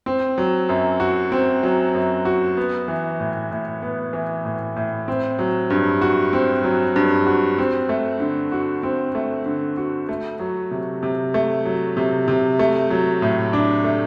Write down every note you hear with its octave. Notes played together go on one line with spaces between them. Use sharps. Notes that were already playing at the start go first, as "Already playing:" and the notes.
C4
F#3
F#2
F#4
C4
F#3
F#2
F#4
B3
E3
A2
A2
B3
E3
A2
A2
C4
F#3
G2
F#4
C4
F#3
G2
F#4
C4
A3
D3
F#4
C4
A3
D3
F#4
A3
F#3
C3
C3
A3
F#3
C3
C3
A3
F#3
A2
D4
A3